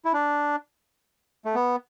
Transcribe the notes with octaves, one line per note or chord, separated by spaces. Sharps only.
E4
D4
A3
B3